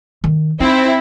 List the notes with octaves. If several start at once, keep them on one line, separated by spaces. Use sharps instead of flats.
D#3
C4 D#4 E4